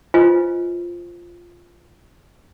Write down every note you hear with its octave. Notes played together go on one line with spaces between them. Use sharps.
F4 B4 C5 D#5 G#5